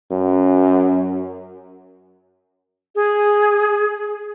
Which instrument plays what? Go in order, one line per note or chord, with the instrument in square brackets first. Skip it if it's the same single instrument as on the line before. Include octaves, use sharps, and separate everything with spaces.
[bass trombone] F#2
[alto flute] G#4